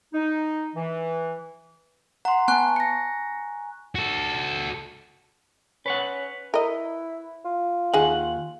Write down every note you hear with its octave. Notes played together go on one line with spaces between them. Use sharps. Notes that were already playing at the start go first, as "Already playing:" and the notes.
D#4
E3
F#5 A#5 C6
B3 G#5 A5 C#6 F#6
A#6 C#7
F#4 A4
C#4 B4 C#5 F#5
E4 A#4 D#5
F4
D#2 D#4 G#4 F#5